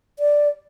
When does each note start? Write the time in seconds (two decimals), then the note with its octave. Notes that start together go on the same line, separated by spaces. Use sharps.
0.19 D5